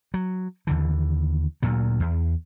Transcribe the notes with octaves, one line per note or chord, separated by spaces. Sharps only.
F#3
D#2 D3 E3
D2 A#2 F#3
E2